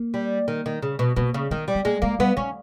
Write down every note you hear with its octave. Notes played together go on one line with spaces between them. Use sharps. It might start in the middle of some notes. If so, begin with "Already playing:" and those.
Already playing: A#3
G3
D#3
D#3
C#3
B2
B2 A#3
C#3
D#3 B3
G3
B3
G#3 A#3
G#3 A#3
G3 B3
D#3 C#4